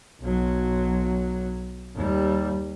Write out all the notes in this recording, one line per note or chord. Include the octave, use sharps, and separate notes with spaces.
B1 F#3
D#2 G3